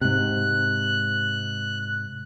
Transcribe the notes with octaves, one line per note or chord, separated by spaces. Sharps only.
G#2 C3 F#6